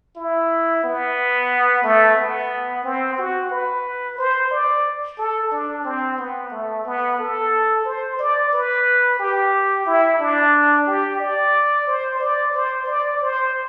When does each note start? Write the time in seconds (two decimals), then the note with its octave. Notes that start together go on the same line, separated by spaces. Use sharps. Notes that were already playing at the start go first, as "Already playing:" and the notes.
0.16 E4
0.84 B3
1.83 A3
2.17 B3
2.84 C4
3.18 F#4
3.51 B4
4.18 C5
4.51 D5
5.18 A4
5.52 D4
5.85 C4
6.18 B3
6.51 A3
6.85 B3
7.19 A4
7.85 C5
8.19 D5
8.53 B4
9.19 G4
9.86 E4
10.20 D4
10.86 G4
11.20 D5
11.87 C5
12.20 D5
12.54 C5
12.87 D5
13.21 C5